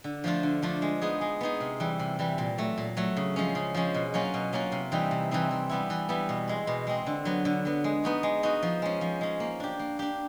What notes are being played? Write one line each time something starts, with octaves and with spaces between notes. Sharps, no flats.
D3
F3 A3 D4 F4
D3
F3 A3 D4 F4
G#3
B3 D#4 G#4
G#3
B3 D#4 G#4
C3
E3 G3
C3
E3 G3
A#2
F#3 A3
A#2
F#3 A3
C#3
F3 G#3 C#4
C#3
F3 G#3 C#4
B2
F#3 A#3 C#4 F4
B2
F#3 A#3 C#4 F4
C3
E3 G3 C4 D#4
C3
E3 G3 C4 D#4
E3
G3 B3 E4
E3
G3 B3 E4
B2
G#3 C4
B2
G#3 C4
D3
F#3 B3
D3
F#3 B3
G#3
B3 D#4 F#4
G#3
B3 D#4 F#4
F3
G#3 C#4
F3
G#3 C#4
A#3
D4 G4
A#3
D4 G4